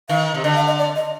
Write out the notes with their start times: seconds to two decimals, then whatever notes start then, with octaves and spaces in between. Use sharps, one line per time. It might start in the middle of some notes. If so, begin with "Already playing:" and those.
0.09 D#3 F5
0.34 C3
0.44 D3 D#5
0.55 F5
0.67 D#5
0.79 D5
0.96 D#5